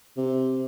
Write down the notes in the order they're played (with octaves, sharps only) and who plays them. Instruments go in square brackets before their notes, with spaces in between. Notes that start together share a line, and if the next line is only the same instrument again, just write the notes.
[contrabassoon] C3